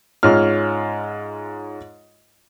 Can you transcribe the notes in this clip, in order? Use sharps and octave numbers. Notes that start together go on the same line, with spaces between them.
G#2 C#4 F4 F6